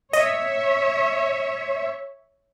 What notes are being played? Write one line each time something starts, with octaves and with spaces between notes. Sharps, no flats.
C#5 D#5 E5